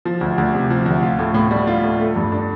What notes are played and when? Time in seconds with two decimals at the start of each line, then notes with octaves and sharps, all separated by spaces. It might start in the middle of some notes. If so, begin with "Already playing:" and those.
0.05 F3
0.21 D2
0.38 D2
0.54 C3
0.70 F3
0.86 D2
1.03 F4
1.19 A2
1.34 A2
1.51 G3
1.67 F4
1.83 A2
2.00 A3
2.16 G2
2.32 D4